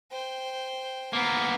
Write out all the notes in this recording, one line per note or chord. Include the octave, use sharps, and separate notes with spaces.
C5 G5
A#3 B3 A#5